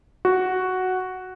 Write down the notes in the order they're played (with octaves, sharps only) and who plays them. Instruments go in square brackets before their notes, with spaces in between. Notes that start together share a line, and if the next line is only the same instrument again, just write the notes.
[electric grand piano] F#4